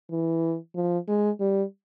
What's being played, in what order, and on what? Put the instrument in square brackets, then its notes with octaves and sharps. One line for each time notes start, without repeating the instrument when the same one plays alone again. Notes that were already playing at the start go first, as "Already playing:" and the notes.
[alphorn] E3
F3
G#3
G3